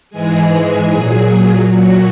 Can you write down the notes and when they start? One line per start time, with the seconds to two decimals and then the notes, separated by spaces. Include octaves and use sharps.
0.10 G#2 E3 G#3 G#4
0.89 A#2 F#3
1.68 A#2 F#3 F#4